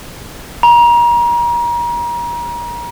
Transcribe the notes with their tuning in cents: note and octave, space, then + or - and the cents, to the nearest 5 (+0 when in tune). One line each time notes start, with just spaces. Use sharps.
A#5 +35